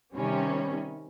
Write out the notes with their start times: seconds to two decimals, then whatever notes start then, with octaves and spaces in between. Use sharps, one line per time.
0.15 C3 D#3 G3 C#4